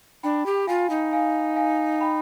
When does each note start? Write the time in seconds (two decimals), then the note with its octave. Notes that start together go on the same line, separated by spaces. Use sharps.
0.23 D4 G5 B5
0.46 G4
0.67 F4 F5 G#5
0.90 D#4
1.13 F5 G#5
1.56 F5 G#5
2.01 G5 B5